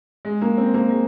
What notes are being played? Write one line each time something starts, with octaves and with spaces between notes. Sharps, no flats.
G#3
A#3
C4
A#3
G#3